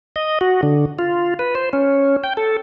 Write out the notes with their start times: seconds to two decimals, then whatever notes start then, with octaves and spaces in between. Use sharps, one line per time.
0.16 D#5
0.41 F#4
0.63 D3
0.99 F4
1.39 B4
1.55 C5
1.73 C#4
2.24 G5
2.37 A4